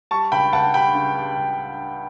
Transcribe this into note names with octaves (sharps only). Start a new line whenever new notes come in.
G3 A5 C#6
C#2 G5 B5
C#2 F#5 A5
G3 G5 B5
C#3
G3
C#2